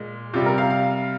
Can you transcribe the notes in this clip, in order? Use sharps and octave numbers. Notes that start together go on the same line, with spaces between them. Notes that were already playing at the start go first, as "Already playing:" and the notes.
Already playing: A#2 G#3
C3 G3 F4
A#4
F5
F5